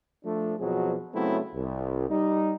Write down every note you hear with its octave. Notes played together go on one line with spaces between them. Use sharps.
F3 A3 D4
F2 B2 F3 F#3 G#4
C#3 F#3 A3 B3 C4 E4
C2
G3 D#4